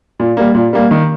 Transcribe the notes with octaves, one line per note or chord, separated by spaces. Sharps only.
A#2
G3 A#3
A#2
G3 A#3
D#3